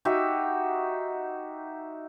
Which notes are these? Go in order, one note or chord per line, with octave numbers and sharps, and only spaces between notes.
D#4 F#4 G4 E5